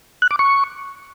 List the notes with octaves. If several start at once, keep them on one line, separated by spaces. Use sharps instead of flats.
F#6
D6
C#6